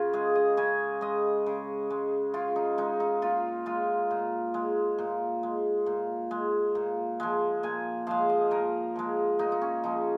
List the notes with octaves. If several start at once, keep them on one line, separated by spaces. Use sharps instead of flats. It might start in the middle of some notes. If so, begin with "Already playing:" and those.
Already playing: C#3 F4
G#3 G#4
D#5
C#3 G#5
G#3 D#5
C#3
G#3
C#3 F4
D#4
G#3 D#4
D#4
A#2 F4
G#3 F4
A#2
G#3
A#2
G#3
A#2
G#3
A#2
F3 G#3
A#2 G#5
F3 G#3 F5
D#5
A#2 A#4
F3 G#3
A#2 D#4
D#4
C#4
F3 G#3 D#4